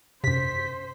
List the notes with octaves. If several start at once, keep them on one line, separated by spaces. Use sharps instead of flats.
F#2 C3 C5 B6